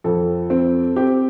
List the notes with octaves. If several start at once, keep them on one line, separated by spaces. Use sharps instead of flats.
F2 A4
C4
C4 G4